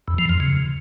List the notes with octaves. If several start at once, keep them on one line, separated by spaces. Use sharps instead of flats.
E2
F3
F2
C#3